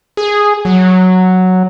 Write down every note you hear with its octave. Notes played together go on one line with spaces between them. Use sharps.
G#4
F#3